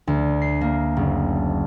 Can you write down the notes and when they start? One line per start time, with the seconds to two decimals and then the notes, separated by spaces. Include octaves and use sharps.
0.07 D2
0.42 C7
0.61 A#3
0.97 F#1